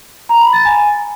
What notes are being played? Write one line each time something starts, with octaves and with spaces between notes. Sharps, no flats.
A#5
B5
A6
G#5